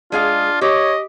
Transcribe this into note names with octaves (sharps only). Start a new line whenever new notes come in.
G#3 D4 F4 G#4 F5
G4 C#5 D#5